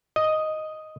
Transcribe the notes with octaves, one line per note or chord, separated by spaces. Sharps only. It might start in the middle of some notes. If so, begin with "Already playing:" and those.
D#5